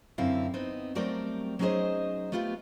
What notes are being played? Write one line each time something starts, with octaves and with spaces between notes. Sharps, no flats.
F#2 D3 C4 E4 F5
B3 C4 D#4
F#3 G3 A3 C4 A#4 D5
F#3 C#4 D#4 G#4 C5 D#5
A3 B3 F4 G4 B4